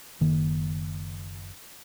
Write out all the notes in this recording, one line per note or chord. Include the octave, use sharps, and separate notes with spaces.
F#1 D#3 A#3